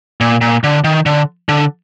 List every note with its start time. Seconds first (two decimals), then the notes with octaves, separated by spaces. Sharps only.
0.21 A#2
0.41 A#2
0.64 D3
0.84 D#3
1.06 D3
1.49 D3